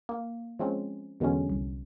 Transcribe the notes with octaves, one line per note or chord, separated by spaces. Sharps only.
A#3
F3 G#3 C4 C#4
E2 B2 D3 F#3 G#3 C#4
C2